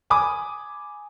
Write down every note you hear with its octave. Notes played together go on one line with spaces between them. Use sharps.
G#5 B5 D6 D#6